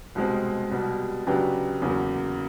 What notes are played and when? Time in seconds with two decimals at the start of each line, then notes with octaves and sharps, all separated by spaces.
0.15 C2 B2 G#3 C4
0.71 C2 B2 G3
1.27 C#3 F#3 B3 D4 G4
1.82 E2 C#3 F#3 A#3